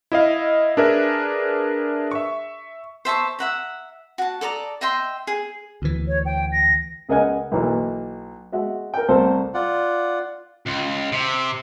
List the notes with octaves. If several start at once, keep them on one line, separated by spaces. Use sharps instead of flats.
E4 D#5 F5
D4 G#4 A#4 B4 E5
E5 C#6
C5 E5 A5 C#6
E5 F#5 A#5
F#4 A5
A4 D5 A#5 D#6
D#5 E5 G5 C6
G#4
D2 E3
C#5
G5
A#6
C#2 G#4 A#4 D#5 F#5 G#5
B1 B2 E3 A#3
G#3 F#4 E5
A#4 G5
C2 A3 A4 A#4 C5
F4 D5 F#5
C#2
C3